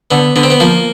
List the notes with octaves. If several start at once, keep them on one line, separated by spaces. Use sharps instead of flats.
D3 B3
D3 B3
C4
B3
F3 A#3